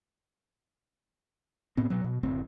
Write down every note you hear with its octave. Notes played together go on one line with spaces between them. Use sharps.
A2 B3 C4
B2 F#3
B2
F#1 D2 A2 C4